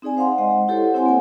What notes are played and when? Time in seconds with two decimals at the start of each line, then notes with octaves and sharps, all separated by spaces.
0.02 C4 D#4 G#4 D5 G#5
0.17 C5 F5 F#5 C6
0.38 G#3 D#5 F#5
0.68 E4 G4 A4 C5 C#5 F#5
0.94 C4 E4 C#5 F#5 G#5 C6
1.06 A#3 G#5